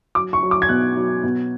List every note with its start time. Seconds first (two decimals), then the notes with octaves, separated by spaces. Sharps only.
0.15 F#3 D6
0.33 C#6
0.43 F#3
0.51 D6
0.62 G#6
0.69 B2 F#6
0.97 F#3
1.24 B2